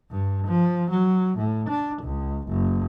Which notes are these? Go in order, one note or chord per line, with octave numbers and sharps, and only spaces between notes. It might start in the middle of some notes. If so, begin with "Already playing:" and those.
G2
F3
F#3
A2
D4
C#2
F#1